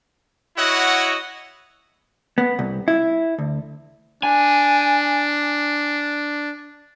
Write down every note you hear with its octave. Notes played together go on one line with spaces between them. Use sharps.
E4 F#4 C#5 D#5 F#5
B3
C2
E4
D2
D4 G#5